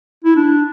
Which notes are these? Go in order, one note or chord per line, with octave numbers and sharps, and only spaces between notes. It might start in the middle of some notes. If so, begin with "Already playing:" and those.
E4
D4